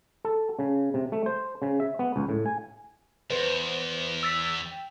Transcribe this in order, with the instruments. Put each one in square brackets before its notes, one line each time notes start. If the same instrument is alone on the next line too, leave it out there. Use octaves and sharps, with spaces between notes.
[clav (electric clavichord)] A4
C#3
C3
A3
C5
C#3
E5
B3
C#2
A2
G#5
[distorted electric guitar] E2 [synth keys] B4 C5
[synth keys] E6 A6 B6
G5